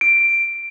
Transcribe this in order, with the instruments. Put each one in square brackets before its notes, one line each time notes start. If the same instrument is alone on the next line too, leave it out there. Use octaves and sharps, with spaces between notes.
[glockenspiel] D7